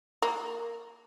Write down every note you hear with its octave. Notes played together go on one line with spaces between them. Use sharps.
A#3